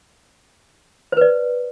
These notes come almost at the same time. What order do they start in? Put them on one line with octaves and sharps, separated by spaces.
C5 B4 D5